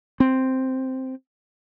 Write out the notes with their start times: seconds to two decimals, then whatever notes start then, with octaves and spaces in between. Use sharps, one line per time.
0.20 C4